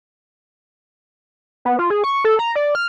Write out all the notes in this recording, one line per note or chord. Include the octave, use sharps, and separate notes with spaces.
B3
F4
G#4
C#6
A4
A#5
D5
F6